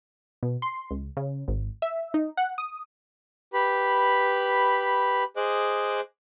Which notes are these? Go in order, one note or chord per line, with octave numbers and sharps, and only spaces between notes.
B2
C6
C#2
C#3
G#1
E5
D#4
F#5
D#6
G4 B4 B5
G#4 C5 D#5 D6 F#6